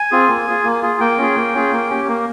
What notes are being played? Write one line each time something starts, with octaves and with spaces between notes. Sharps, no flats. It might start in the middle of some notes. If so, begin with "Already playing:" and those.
Already playing: G#5
C4 F4 G#4
A#3
F4 G#4
A#3
F4 G#4
A#3 G5
C#4 F4 G#4
A#3
C#4 F4 G#4
A#3
C#4 G4
A#3